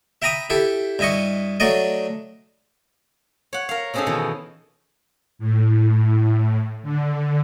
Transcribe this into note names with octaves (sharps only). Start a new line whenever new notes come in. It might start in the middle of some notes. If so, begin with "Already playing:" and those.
E5 G5 A#5 B5 D#6
E4 G4 A4
G2 E4 D#5 C#6
F#3 A3 D4 D5 D#5
C#5 F#5
A#4 F5
C3 C4 C#4 D#4 G#4 A4
B2 D#3 E3
A2
D3